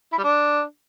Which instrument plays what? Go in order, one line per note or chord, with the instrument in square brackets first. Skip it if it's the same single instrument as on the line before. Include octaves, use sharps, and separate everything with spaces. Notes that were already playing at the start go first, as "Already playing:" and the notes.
[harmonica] E4
G3
D4